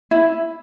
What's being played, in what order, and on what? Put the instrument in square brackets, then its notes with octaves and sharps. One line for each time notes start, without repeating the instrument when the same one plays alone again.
[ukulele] E4